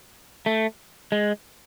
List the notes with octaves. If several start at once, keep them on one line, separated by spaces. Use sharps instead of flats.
A3
G#3